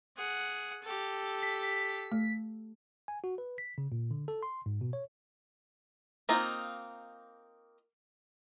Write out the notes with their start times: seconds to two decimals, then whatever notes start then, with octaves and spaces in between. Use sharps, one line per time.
0.17 G#4 F#5
0.83 G4 A4
1.43 B6
2.12 A3
3.08 G#5
3.24 F#4
3.38 B4
3.58 B6
3.78 C#3
3.92 A#2
4.11 D3
4.28 A4
4.43 C6
4.66 G#2
4.81 B2
4.93 C#5
6.29 A#3 C4 D#4 F4 D#5